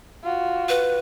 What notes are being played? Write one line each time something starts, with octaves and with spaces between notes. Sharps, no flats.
F4 F#4
B4